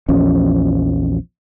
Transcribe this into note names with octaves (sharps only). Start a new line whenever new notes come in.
A#1 E2 F3 C#4